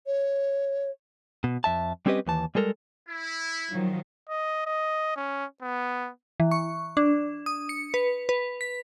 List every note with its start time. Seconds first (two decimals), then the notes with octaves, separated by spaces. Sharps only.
0.07 C#5
1.44 B2
1.64 F2 E5 A5
2.06 G3 C4 C#4 G4 B4 D#5
2.27 D#2 E3 A5
2.55 G3 G#3 A4 A#4
3.07 E4
3.72 D#3 F3 F#3
4.29 D#5
4.66 D#5
5.16 C#4
5.62 B3
6.40 E3
6.51 C#6
6.97 D4
7.46 D#6
7.69 C#7
7.94 B4
8.29 B4
8.61 B6